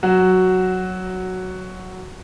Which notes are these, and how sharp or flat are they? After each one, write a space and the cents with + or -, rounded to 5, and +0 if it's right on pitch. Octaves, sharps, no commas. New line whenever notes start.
F#3 +0 F#4 +5